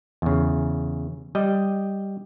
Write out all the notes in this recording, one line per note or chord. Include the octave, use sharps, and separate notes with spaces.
E2 C#3
G3 D#5